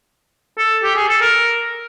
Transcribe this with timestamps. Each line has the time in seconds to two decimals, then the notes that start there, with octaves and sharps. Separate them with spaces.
0.58 A4
0.84 G4
0.96 G#4
1.09 A4
1.21 A#4